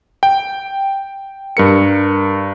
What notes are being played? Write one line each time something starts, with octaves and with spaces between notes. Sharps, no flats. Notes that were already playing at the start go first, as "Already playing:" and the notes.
G5
G2 A#4 C#7